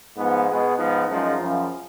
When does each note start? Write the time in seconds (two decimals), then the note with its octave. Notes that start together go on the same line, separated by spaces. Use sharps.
0.16 G#2 F3 B3
0.46 B2 G#3 B3
0.77 G#2 F3 B3 D#4
1.07 F#2 F3 G#3 D#4
1.37 F#2 C#3 F3